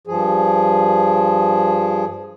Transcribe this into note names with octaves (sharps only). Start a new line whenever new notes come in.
G2 F3 G#4